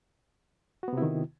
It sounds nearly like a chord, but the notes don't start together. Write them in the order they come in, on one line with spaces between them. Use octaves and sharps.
F#4 B3 C3 E4 D#3